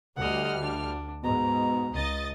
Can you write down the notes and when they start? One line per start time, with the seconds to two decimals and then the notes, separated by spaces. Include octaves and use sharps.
0.17 D2 G3 D#5 F#5 F6
0.61 D4
1.24 G#2 B2 A#5
1.93 C#2 D#5 A6